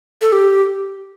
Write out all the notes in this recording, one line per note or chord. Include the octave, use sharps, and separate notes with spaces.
A4
G4